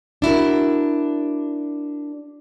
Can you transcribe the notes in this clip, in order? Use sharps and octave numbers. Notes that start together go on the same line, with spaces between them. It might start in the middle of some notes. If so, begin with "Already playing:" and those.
D4 E4 F#4 A#4